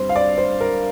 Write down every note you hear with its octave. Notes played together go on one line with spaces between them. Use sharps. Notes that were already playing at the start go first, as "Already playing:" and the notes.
Already playing: G2 G3 C4 C5
F5
D5
C5
A#4